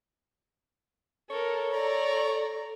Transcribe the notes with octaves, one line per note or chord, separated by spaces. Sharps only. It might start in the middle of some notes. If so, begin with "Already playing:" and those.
A4 A#4 C#5
A4 D5 A#5